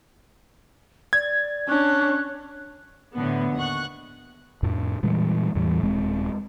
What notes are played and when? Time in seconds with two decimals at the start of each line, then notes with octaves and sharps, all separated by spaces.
1.13 D5 G#6
1.68 C#4 D4 F#6
3.15 A2 D3 B3
3.55 D#2 F#5 C#6 F#6
4.63 F2 A2
5.03 A#2 E3 G3 G#3
5.55 E2 A2 E3 G3
5.83 D#1 G#3 C4